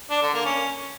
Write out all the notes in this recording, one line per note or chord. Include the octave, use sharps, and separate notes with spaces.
D4
D3
A#3
C#4